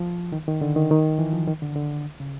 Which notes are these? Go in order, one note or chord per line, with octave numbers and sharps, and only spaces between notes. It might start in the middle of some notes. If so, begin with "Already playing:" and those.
Already playing: F3
D#3
D#3
D3
D#3
D#3
E3
F3
D#3
D3
D3
C#3